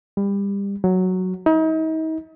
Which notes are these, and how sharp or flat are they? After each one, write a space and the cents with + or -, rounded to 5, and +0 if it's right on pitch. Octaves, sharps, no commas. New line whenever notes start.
G3 +30
F#3 +0
D#4 +40